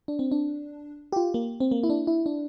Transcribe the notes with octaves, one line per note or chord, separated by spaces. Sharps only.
D4
C4
D4
G4
F4
A#3
C4
A#3
E4
D4
E4
D4